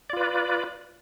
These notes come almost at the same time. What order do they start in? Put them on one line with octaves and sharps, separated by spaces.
D5 F4 B4